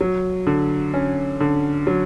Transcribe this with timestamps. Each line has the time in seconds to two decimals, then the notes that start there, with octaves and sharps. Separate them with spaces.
0.01 F#3
0.47 D3
0.94 C#4
1.40 D3
1.87 F#3